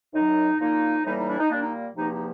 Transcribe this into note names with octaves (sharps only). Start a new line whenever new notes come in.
F#2 D#3 F#3 D#4
A#2 F3 A#3 D#4
A2 E3 G3 A#3 D#4
D#4
D4 E4
D#4
A#2 G3 A#3 D4
D#4
E2 C3 F3 A#3 D#4
D#4